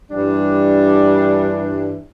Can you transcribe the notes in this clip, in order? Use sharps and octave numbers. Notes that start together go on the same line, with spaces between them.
G2 E3 G3 D4